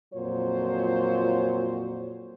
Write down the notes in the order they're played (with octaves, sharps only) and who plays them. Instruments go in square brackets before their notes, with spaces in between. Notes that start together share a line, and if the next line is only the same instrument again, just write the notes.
[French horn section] F2 A#2 F#3 F4 C5 C#5